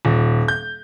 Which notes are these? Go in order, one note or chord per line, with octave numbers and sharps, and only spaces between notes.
D#1
G6